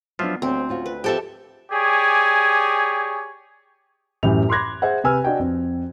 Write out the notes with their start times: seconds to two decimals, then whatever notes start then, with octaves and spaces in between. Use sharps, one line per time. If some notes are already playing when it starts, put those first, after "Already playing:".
0.19 F3 F#3 B3 D4 F4 E5
0.42 D2 G3 C4 C#5
0.69 C#4 F4 F#4
0.86 B4
1.04 F3 C4 F4 G4 A4 E5
1.70 G4 G#4 C#5 D5 G#5
4.23 F#2 A2 E3 G4 F7
4.49 B5 C6 D6 F#6 G#6 A#6
4.82 G#4 C5 E5 F#5
5.04 C3 B4 G#5 E6 F6
5.24 D4 F#4 D#5 G5 G#5
5.39 F2